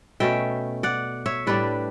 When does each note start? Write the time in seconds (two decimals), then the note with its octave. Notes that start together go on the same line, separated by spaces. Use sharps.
0.20 B2 A3 C#4 E5 G5
0.83 D5 F#5
1.26 C#5 E5
1.47 A2 G3 D4 B4 D5